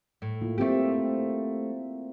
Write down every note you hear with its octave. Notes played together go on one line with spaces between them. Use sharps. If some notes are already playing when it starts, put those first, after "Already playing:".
A2
A#3 E4 F4
A3 A#3 C4 G4 E5